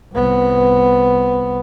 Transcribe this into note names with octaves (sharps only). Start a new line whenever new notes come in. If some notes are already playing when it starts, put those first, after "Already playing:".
C2 B3